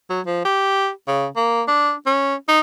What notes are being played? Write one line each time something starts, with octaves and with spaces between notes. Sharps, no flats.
F#3
F3
G4
C#3
A#3
D4
C#4
D#4